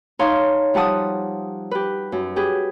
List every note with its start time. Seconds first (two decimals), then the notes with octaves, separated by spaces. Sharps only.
0.19 D#4 C#5 F5 A5 C6
0.74 F3 G3 F#5 A5 D#6
1.71 G4 B4
2.12 F#2
2.36 G4 G#4 B4